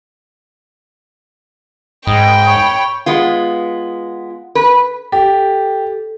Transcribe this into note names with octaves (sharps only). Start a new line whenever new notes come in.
G#2 D#5 G5 B5
C#5
G#3 B3 F4
B4
G4 A4